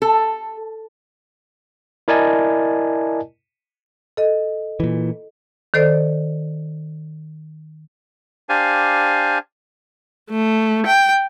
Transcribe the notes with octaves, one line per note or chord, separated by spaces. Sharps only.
A4
E4 A#4 D5 D#5 G#5 A5
A4 D#5
A#2 E3
D#3 A4 C5 D5
D4 G4 C5 F5 G#5
A3
G5